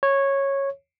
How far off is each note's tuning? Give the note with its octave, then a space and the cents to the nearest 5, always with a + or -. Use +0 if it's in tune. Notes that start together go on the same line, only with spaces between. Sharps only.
C#5 -10